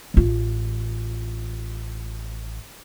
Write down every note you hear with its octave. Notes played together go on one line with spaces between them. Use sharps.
A1 F4